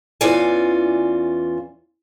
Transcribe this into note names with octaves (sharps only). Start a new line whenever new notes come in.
E2 E3 C#4 F4 D5 G#5